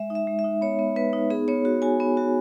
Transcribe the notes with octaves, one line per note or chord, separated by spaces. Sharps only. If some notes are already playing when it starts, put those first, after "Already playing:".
Already playing: G#3 E5
D#4
E5
G#3
E5
D#4
B3 C#5
B3
B3 B4
D#4
B3 G#4
B3 C#5
F#4
F#4 G#5
B3
F#4